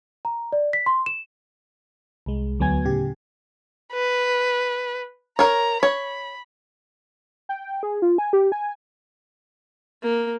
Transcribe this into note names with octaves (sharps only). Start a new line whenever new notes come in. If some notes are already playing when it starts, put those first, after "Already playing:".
A#5
D5
B6
C6
E7
C2 G#3
D2 F#3 B3 G#5 G#6
A2 C#3 G4
B4
A#4 C#5 A#5
C#5 B5
G5
G#4
F4
G#5
G4
G#5
A#3